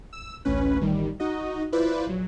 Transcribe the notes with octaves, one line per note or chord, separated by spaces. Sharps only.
E6
A1 D2 C#4 B4
A1 D#3 G3
D#4 F#4 D#5
E4 F4 B4 C5 D5
A#1 F#3